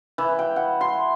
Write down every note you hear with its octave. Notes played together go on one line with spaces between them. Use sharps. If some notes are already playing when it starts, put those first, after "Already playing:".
E3
G5
F#5
C6